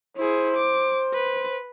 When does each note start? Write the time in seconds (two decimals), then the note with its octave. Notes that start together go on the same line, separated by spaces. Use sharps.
0.17 E4 G#4 C5
0.57 D6
1.14 B4